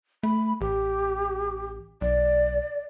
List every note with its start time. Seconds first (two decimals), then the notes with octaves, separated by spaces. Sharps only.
0.23 A3 B5
0.61 A1 G4
2.01 B1 D5